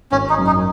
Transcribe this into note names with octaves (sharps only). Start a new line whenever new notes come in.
G#1 C#4
D#4
F#2 D#3 F#3 C#4
D#4